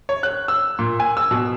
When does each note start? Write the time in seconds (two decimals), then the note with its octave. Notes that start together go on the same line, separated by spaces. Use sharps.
0.09 C#5
0.23 F#6
0.48 E6
0.79 A#2
1.00 G#5
1.17 E6
1.31 B2